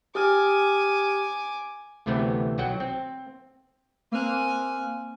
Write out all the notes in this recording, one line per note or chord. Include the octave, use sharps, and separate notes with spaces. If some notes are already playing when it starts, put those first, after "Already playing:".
G4 G#5 D6 D#6 F6
D2 C3 E3 A3 B3 C4
B1 F#3 F#4 F#5 G5
C4
A#3 C4 G#5 F6 F#6